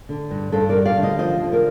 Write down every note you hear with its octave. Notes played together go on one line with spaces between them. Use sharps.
D3
G2
G2 A4 C5
A#4 D5
G3
D5 F5
D3
C5 D#5
F3 C5 D#5
D3
A#4 D5